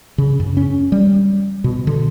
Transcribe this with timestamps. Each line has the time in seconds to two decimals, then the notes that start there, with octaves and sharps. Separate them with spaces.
0.18 C#3
0.40 F#2
0.57 C#4
0.92 G3
1.64 B2
1.87 D3